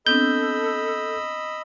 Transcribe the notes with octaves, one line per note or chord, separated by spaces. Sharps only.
B3 C4 D4 A4 D#5 B5 E6 G6